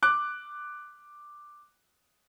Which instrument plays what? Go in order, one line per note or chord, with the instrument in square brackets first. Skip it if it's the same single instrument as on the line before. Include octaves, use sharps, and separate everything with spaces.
[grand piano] D6 F#6